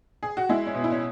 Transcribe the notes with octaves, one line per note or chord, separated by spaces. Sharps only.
G#4
F#4
G#3 E4
C#4
B2
E4
C#4